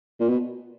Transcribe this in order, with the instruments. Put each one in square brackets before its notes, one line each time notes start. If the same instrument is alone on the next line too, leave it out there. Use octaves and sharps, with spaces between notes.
[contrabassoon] A#2
B2